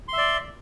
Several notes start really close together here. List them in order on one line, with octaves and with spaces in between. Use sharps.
C6 E5 D5